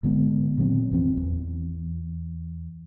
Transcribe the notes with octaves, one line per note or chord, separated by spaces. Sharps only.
G#1 D3 G#3 B3
A#2 D#3 F#3 C4
G#1 F2 E3 C4
E2